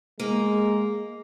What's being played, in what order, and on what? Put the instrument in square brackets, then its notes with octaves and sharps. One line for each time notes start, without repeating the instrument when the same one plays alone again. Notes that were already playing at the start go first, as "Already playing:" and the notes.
[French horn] G#3 [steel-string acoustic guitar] A#3 A#4